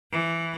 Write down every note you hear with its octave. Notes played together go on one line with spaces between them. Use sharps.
E3